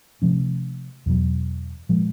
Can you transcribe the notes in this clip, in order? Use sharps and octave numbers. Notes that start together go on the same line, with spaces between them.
C3 F3 A3 C#4
E2 B2 F#3
A#2 F3 G#3